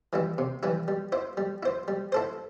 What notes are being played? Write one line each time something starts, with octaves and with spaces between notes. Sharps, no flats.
E3 G3 E4
C3
E3 G3 E4
G3
E4 C5
G3
E4 C5
G3
E4 A4 C5